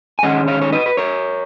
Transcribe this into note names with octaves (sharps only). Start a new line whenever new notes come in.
G#5
G#2 D#3 G#3 C#4 D#5 F#5
C#5 F5
C#5
B4 D#5
B4
A#4 C#5